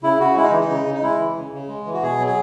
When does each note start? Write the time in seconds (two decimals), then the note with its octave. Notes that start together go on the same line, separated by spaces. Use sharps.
0.03 C#3 E4
0.20 C#3 F#4
0.36 G#3 E4
0.44 D#4
0.52 E3
0.61 D#4
0.70 C#3
0.86 C#3
0.94 D#4
1.02 G#3 E4
1.19 E3
1.35 C#3
1.53 C#3
1.69 G#3
1.86 E3
1.94 F#4
2.02 B2 G#4
2.19 F#3
2.27 G#4